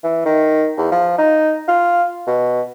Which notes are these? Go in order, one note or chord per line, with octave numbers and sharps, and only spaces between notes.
E3
D#3
E2
F3
D#4
F4
B2